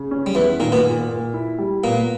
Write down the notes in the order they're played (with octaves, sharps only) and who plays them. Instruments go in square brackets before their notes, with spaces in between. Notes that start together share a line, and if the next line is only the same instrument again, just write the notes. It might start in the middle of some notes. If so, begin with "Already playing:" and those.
Already playing: [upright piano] C#3
C#4
[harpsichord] G3
[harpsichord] E2 E3 [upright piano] B3
[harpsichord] A#2 A#3 [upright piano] D#3
[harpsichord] B2 B3
[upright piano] A#2
A#2
E4
G3
[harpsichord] A#2 A#3 [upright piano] B3